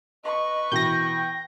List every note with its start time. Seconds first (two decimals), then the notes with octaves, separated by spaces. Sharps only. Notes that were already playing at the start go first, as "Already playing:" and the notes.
0.24 B4 D#5 C#6
0.72 B2 E3 G5 G6 A#6